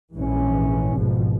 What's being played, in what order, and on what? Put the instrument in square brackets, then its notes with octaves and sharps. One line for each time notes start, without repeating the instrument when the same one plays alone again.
[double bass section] A#1 G#2 E3 C#4
G#1 G#2 B2 F3